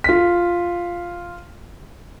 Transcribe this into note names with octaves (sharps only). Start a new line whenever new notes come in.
F4 B6